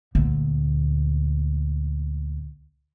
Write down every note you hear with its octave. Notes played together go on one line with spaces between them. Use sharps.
D2 A#2